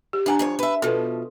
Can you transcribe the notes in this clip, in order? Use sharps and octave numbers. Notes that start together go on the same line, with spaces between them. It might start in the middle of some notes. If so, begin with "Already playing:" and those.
G4
G2 D4 F#5 G#5 A#5
G2 F3 C#5
B4 E5
B2 F3 A4 B4